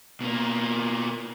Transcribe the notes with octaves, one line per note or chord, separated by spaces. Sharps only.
B2 A#3